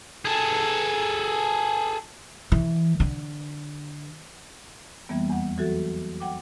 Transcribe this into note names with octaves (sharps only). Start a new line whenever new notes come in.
G#4 A4
E3
D3
F2 E3 G3 A#3 B3
E2 F#5
E3 F#3 F#4 A4
F#5 G5 D6